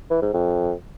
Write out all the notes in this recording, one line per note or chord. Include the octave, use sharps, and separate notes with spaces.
E3
G#2
F2